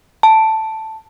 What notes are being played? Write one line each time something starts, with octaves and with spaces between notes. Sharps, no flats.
A5